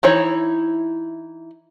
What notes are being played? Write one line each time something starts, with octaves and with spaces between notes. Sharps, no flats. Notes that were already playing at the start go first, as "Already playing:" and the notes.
E3 D#4 E4 C#5